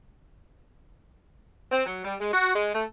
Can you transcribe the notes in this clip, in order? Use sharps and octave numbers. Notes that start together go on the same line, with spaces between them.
C4
F#3
G3
G#3
F#4
G#3
A3